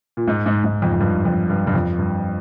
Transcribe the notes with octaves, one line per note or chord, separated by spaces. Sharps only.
A#2
G#2
G#2
G#2
F2
F2
G2
F2
G2
G2
F2
G2